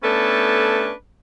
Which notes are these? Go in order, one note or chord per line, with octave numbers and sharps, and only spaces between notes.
A3 B3 C#4 D4 A4 B4